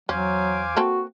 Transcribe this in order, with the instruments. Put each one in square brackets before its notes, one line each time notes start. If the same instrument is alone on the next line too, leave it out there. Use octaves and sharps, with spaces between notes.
[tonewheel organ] E2 D6 [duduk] F#3 [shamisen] C#4 [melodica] C5 F5 G#5
[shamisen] A#3 C4 A4 [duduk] F#4